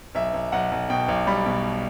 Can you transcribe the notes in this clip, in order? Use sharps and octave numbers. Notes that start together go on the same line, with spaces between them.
B1 E5
B1
B1 F#5
B1
B2 G5
B1
G3 B5
B2